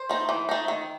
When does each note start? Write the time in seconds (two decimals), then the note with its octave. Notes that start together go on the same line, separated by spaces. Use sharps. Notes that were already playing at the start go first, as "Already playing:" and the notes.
Already playing: C5
0.09 A3 D#4
0.29 E3
0.49 A3 D#4
0.68 D#3